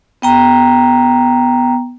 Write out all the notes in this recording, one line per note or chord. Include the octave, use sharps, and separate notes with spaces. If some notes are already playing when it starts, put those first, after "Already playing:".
B3 G5 A#5